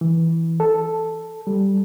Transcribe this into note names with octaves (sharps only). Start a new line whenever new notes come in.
E3
A4
G3